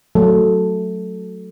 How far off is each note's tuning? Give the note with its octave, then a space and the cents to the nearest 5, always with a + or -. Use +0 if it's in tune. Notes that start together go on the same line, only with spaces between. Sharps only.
F#3 +0 A3 +0 A4 +0